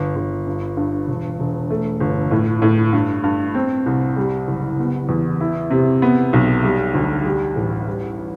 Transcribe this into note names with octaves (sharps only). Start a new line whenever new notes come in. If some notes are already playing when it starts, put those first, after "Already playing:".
Already playing: G1
G1
G2
G2
E1
E1
A3
G1
A2
A2
G2
G2
C4
C2
G3
F#1
B3
E2
E4
C3
B3
B1
G3
D2
G3
A1
G3